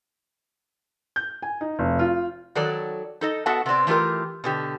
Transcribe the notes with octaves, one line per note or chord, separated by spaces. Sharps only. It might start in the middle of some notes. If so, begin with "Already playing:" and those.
G6
G#5
D#4
F1
F4
D#3 F#3 A4 D5
D#4 A4 D#5
B3 F#4 A4 E5 F#5 A5
C3 B3 C4 D5
E3 A3 F4 G4 A#4
B2 D3 G4